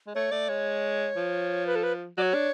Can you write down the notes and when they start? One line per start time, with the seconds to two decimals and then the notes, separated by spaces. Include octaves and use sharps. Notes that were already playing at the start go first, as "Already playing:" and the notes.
0.07 G#3
0.15 A3 C#5
0.32 A3 D5
0.49 G#3 C#5
1.16 F3
1.67 B4
1.76 A4
1.83 B4
2.18 F#3 D5
2.22 C#5
2.34 D4